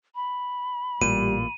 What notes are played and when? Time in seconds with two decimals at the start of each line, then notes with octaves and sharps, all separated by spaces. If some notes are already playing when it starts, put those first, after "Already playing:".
0.15 B5
1.02 A1 A#2 G3 D#7